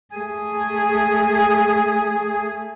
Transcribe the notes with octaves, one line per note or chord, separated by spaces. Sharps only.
A3 G#4